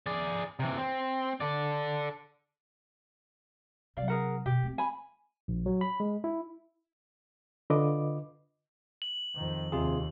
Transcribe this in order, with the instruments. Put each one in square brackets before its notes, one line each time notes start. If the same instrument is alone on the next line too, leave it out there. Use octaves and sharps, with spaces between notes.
[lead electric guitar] G#4 D5
C3 E3
C4
A4 D5
[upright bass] C3 F#3 [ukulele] D5 F5
[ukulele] G#4 A#4 F#5
[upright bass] B2 [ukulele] G4
[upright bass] A3 C4
[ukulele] G#5 B5
[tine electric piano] A#1
F#3
B5
G#3
E4
[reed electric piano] D3 F4 B4 D#5 D6
[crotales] F#7
[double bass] F2 D#3
[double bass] D#2 [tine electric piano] C3 F4 G#4